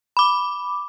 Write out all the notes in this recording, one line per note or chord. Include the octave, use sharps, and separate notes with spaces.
B5 D6